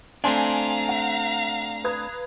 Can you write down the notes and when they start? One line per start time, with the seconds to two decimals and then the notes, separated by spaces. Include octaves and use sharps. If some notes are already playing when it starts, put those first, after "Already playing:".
0.24 A3 C4 D4 F5 G#5 A#5 C6
0.89 F#5
1.84 B4 D#6 G#6